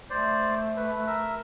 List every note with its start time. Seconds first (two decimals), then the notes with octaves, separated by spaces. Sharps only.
0.10 A3 C5 D5
0.76 B4
1.07 A#4 E5